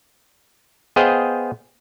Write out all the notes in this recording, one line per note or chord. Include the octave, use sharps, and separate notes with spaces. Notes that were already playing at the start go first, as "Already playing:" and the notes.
B3 G#4 C5 D#5 F5 G5